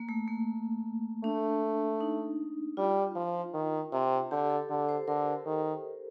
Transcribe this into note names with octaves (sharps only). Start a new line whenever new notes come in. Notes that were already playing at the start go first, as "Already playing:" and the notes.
Already playing: A#3
A3
A#3
A3 D4
D#4
G3 F4
F3
D#3
C3
D3 G4
A4
D3
C5
D3 A#4
D#3